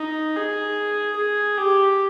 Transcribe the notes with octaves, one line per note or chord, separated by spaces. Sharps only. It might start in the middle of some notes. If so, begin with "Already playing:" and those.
Already playing: D#4
G#4
G#4
G4